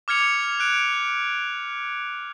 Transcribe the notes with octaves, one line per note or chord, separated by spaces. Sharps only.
D6 F6 G#6 C#7 F7
F#6 D7